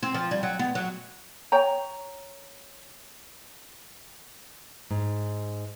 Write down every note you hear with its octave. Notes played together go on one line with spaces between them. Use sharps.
C4
F3
G3
F#3
B3
F#3
C#5 G5 A#5
G#2